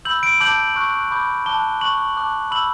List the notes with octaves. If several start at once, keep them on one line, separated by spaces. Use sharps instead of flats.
B5 E6 G6 F#7
D7
A5 D6 G6 F#7
C#6 F#6
B5 D6 G6
A5 D6 F#6 G7
C#6 F#6 F#7
A5 D6 F#6
B5 E6 G6 F#7